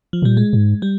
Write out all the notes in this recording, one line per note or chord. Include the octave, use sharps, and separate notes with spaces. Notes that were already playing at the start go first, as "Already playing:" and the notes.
F3
A#2 G3
G#3
G#2
G3